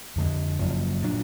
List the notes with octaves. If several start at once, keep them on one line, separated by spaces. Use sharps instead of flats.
F2 D3 G#3
F#1 F#2 F3
A#2 F#3 D4